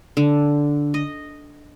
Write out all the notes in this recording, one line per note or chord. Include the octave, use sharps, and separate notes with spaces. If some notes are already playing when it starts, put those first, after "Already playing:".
D3
D#5